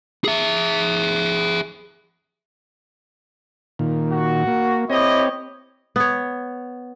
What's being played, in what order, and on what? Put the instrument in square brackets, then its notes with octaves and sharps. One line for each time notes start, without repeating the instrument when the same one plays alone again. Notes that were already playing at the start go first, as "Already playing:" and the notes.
[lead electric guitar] G#4 E5
[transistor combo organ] A#2 D#3
[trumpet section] F#4
[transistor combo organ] A#3
[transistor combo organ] C4 C#5 [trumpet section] E4 G4 D#5
[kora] B3 C#5